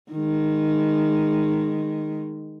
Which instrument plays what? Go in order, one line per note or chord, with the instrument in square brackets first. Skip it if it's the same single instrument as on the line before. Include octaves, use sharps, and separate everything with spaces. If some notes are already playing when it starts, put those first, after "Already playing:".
[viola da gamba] D#3 G#3